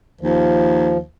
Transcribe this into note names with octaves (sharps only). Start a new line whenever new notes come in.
D#2 F3